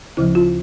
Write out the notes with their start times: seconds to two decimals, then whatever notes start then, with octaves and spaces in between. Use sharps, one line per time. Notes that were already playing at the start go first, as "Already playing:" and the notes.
0.17 D2 C#3 F3 E4
0.35 F4